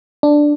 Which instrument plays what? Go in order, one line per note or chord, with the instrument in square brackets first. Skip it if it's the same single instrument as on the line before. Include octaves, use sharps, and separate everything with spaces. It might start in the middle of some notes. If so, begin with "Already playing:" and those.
[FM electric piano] D4